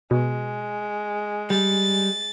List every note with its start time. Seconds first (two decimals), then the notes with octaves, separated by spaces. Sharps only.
0.11 B2 G#3
1.50 G3 A6